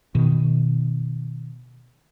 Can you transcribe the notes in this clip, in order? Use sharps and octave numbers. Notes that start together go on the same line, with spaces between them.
B2 D#3